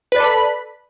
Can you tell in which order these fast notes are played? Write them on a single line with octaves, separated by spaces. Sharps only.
B4 D5 A4 B5